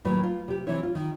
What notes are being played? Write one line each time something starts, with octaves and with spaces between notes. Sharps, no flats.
D#2 A2 F#3 A3 B4
F4
C3 G4
C3 E3 C4 E4 C#5
F4
D#3